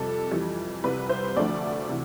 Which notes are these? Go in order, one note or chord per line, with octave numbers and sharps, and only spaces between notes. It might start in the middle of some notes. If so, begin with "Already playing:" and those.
Already playing: F2 C3 G3 A4
F2 E3 G3
C2 C3 G3 B4
C5
D2 D3 F3 A3 D5
C3 E3